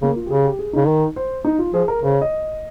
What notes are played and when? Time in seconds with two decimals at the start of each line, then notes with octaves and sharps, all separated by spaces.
0.02 C#3 A#3
0.16 F4
0.26 G4
0.30 C#3 G#4
0.44 G4
0.59 G#4
0.73 C#3 D#4
0.88 D#3
1.16 C5
1.45 D#4
1.59 F4
1.74 F3 G#4
1.88 A#4
2.02 C#3 C5
2.12 C#5
2.21 D#5